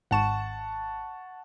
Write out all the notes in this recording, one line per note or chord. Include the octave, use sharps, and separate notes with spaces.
G#1 F#5 A5 C#6 E7